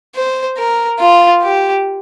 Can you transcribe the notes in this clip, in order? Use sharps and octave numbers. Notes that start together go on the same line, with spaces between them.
C5
A#4
F4
G4